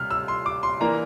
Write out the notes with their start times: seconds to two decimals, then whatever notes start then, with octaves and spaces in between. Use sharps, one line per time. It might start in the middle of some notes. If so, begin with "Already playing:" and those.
Already playing: C3 G3 F6
0.11 E6
0.28 C6
0.46 D6
0.63 C6
0.81 E3 A#3 D4 A#5